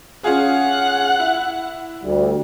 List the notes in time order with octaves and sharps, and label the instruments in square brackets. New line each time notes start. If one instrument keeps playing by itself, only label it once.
[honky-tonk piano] C#4 F4 G#4 [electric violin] F#5
[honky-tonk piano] E4
[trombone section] D2 G3